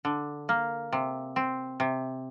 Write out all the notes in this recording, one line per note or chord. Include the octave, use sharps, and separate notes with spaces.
D3
A#3
C3
C4
C3